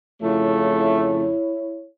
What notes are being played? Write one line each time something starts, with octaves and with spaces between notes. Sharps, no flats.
F2 C#3 A3 E4 C#5